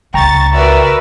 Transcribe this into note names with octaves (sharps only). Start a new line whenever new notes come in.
C#2 G5 A#5 C#6 A6
F#4 A#4 B4 D5 E5